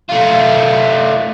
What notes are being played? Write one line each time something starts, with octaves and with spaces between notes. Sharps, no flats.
A3 F4